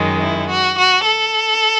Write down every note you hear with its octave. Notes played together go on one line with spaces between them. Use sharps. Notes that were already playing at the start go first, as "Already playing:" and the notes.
Already playing: F#2 D#3 G#3
E4
F#4
F#4
A4